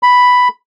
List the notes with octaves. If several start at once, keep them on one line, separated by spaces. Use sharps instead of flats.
B5